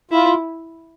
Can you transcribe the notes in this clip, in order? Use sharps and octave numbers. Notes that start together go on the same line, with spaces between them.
E4 F4